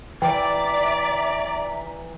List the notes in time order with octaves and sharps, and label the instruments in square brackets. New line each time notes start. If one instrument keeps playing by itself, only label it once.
[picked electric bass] E3 [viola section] D5 [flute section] E5 A#5 [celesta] G5